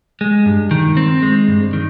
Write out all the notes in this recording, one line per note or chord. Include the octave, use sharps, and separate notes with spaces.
G#3
G2
D#3
C4
G#3
G2
D#3